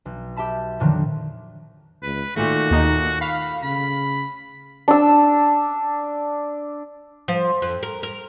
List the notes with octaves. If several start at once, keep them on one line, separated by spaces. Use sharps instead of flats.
B1
G4 E5 A5 B5
F2 A#2 D3 D#3 F3 F#3
C#2 B4
A#2 D#3 A3 F#4
D#2 D#4
F5 B5
C#3 B5
D4 E6
F3
F2
A#4
A#4